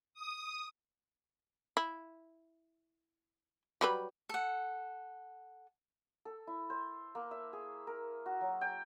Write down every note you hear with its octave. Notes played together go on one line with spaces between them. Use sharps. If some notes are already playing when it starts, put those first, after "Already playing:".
D#6
E4
F#3 G3 B4
A4 F#5
A4
E4
C5
A#3
E5
G#4
A#4
F#4
F#3
G5